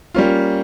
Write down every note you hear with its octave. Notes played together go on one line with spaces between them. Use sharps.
G3 A#3 C#4 F4